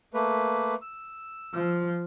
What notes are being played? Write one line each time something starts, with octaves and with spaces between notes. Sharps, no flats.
A3 A#3 B4
E6
F3